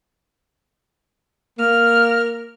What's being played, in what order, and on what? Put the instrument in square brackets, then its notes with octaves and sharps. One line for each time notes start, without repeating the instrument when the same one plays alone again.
[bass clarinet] A#3 [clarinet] A#4 [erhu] F6